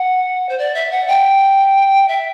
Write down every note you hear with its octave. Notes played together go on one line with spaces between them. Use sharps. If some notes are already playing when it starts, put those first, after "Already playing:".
Already playing: F#5
C5
D5
E5
F#5
G5
E5